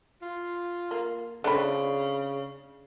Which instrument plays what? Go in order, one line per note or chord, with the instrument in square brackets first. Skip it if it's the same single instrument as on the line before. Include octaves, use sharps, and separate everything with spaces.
[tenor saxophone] F4
[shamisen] A#3
[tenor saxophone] C#3 [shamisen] A3 C4 F4 [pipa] D4 B5